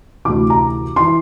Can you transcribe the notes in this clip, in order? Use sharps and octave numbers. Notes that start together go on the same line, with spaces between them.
D2 C3 E3 D6
A#5
E3 C6